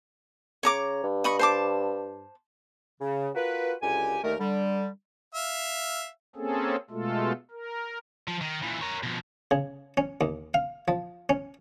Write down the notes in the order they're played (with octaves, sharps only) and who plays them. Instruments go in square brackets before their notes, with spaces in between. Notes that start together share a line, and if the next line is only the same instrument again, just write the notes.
[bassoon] C#3 [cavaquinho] C#5 A#5 D6
[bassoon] G2
[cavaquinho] D#5 B5 C#6
C5 A5 D6
[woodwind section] C#3
F4 F#4 A#4 B4
C#2 F#2 D3 G4 G#5
D#2 D3 D#3 A3 A#4
D3 G3
[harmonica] E5 F5
[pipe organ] A#3 C4 C#4 G#4 A4
B2 G#3 A3 F4 A4
A#4
[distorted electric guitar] F3
D#3
A#2 E3
A#4 C#5
B2 F3
[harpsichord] C#3
C#4
D#2
F5
F3
C#4